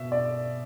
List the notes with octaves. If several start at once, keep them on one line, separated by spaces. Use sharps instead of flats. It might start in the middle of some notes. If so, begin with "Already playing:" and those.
Already playing: B2 E5
D5